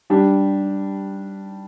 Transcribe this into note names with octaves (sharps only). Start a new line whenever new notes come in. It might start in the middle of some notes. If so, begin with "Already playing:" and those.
G3 D4 G4